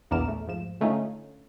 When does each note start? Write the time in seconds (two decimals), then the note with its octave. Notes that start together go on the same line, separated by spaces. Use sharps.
0.11 A#1 E2 A#5 D6 F6 E7
0.28 A3
0.47 G#2 F3 E7
0.80 D3 A3 C#4 D#4 F4